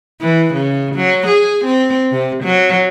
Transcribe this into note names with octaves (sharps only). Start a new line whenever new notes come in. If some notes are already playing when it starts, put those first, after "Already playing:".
E3
C#3
F#3
G#4
C4
C3
F#3